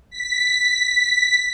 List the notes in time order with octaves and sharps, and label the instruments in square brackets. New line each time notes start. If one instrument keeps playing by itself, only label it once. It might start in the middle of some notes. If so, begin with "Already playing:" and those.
[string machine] B6